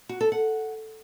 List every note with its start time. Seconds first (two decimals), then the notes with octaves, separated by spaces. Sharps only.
0.09 F#4
0.21 A4
0.32 F#5